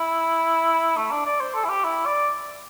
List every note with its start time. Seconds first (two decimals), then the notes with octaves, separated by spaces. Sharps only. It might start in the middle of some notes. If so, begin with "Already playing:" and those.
Already playing: E4
0.97 A3
1.11 D4
1.26 D5
1.40 C5
1.55 A4
1.65 E4
1.69 G4
1.84 E4
2.06 D5